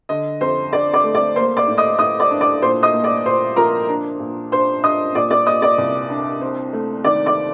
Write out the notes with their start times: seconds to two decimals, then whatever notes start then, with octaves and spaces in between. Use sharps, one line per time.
0.09 D3 D#5
0.41 F2 C5 C6
0.73 D4 D5 D6
0.93 D5 D6
1.04 A3
1.15 D5 D6
1.36 A#3 C5 C6
1.57 D5 D6
1.67 A2
1.78 D#5 D#6
1.99 A2 D#5 D#6
2.20 D5 D6
2.31 D4
2.41 D5 D6
2.62 A#2 C5 C6
2.83 D#5 D#6
2.93 A#3
3.04 D5 D6
3.26 A#2 C5 C6
3.56 F3 A#4 A#5
3.89 D4
4.20 A#2
4.52 D4 C5 C6
4.83 D4 D#5 D#6
5.15 A#2 D5 D6
5.31 D5 D6
5.46 A#2 D#5 D#6
5.62 D5 D6
5.78 C2
6.10 D4
6.41 C4
6.73 A3
7.04 D#3 D5 D6
7.26 D5 D6